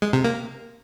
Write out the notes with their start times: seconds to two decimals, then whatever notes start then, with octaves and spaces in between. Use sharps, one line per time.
0.02 G#3
0.13 C3
0.24 A#3